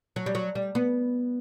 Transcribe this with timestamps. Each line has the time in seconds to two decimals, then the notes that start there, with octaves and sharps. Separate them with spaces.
0.16 F#3
0.26 G3
0.35 F#3
0.55 G3
0.75 B3